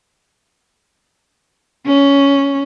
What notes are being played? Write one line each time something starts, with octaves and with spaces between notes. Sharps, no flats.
C#4